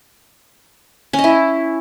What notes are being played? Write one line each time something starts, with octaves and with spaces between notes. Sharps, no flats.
C#4
D#5
E4